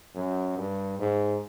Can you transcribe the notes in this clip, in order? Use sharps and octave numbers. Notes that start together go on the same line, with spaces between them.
F#2
G2
G#2